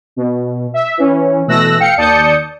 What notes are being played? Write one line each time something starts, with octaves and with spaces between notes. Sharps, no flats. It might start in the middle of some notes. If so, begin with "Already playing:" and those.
B2
E5
E3 C#4
B2 E3 A3 E6 F#6 A#6
F5 G5 C#7
D#2 D5 A5 D#6 G6 C#7